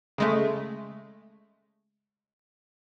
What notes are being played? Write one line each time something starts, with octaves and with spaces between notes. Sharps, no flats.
C#3 G#3 A3